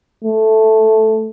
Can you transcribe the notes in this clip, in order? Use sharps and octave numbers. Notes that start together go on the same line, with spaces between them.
A3